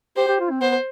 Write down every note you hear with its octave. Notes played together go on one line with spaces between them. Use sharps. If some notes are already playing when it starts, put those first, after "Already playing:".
G4 C5
G4
F4
C4
B3 C5